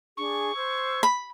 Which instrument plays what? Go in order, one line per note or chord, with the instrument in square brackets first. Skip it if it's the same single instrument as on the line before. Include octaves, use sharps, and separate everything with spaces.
[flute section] D4 G#4 [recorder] C#6
[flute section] C5 E6 G#6
[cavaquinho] B5